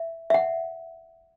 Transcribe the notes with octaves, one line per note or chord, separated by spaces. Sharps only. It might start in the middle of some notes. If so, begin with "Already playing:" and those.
Already playing: E5
E5
F#5